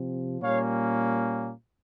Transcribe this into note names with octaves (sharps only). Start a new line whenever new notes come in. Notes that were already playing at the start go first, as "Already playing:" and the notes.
Already playing: C3 F3 C4
A#2 G3 A#3 C#4 C#5 F5